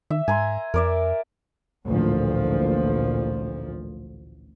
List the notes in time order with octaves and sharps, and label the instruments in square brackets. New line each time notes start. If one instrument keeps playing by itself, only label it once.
[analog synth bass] D#3 [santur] E5
[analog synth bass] G#2 [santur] G#5 A#5 C6
[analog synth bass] F2 [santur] A#4 D5 E5
[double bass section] A1 D2 A#2 F3